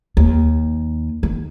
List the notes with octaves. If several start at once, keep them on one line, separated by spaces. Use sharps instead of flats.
D#2
D#3